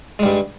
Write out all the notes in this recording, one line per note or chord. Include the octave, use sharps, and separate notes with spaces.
G2 G3 G#3